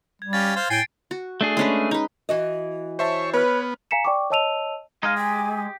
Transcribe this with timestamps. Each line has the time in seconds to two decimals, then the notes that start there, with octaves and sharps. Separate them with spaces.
0.22 G3 G#6
0.33 C#4 G4 F5 A6
0.56 C5 F5
0.70 A2 G5 G#5 C7 D7
1.11 F#4
1.41 A3 D4 G#4
1.57 G#3 C#4 B4
1.91 D#4 B4
2.29 E3 F#4 D#5
2.99 C5 C#5 E5 A5
3.34 B3 B4 C#5 F6
3.91 F5 G#5 A#5 B6 C#7 E7
4.05 D5 G5 C#6 D6
4.30 C#5 D#5 A5 E6 D#7 F7
5.03 G#3 D#4 D#5 F5
5.17 G4 G#5